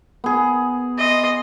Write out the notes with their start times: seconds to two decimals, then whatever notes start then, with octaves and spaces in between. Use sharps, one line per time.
0.24 B3 G#4
0.98 D#5 C6